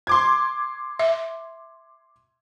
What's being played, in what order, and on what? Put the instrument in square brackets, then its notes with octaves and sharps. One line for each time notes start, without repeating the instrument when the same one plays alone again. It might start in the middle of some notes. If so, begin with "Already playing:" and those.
[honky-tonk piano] C6 D6 G#6
[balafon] E5